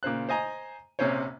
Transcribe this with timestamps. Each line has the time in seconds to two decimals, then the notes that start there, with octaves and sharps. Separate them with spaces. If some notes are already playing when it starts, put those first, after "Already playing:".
0.03 A#2 C#3 C5 F#6
0.29 C5 D#5 G#5 A#5
0.99 A#1 C3 C#4 C5 C#5